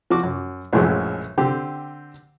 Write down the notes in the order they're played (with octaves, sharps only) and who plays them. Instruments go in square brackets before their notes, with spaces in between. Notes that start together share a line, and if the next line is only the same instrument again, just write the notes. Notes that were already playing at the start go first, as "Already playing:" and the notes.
[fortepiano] F3 F#4 D6
F#2
A#1 F#2 A2 E3 F3 G#3
D3 C4 G4